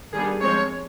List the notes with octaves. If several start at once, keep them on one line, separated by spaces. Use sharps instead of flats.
D#3 G3 B3 D4 G#4
F3 G#3 C4 C#5